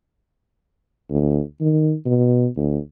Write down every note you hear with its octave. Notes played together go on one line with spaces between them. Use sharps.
D2
D#3
B2
D2